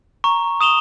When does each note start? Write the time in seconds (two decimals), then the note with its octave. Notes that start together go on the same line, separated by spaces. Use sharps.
0.24 A#5 C#6
0.61 D#6 E7 F7 G7